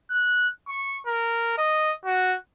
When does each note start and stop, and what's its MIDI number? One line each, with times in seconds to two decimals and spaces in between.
0.10 0.48 90
0.68 0.98 85
1.07 1.55 70
1.58 1.93 75
2.06 2.36 66